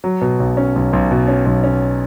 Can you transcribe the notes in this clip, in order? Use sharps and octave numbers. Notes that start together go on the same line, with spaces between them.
F#3
B2
B1
C#4
B1
B1
B2
C#4
B1
C#4